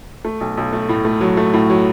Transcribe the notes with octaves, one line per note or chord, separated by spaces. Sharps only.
A3
B1
B1
A3
A2
A3
F#3
A3
A2
F#3